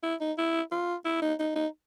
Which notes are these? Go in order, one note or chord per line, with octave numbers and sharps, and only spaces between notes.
E4
D#4
E4
F4
E4
D#4
D#4
D#4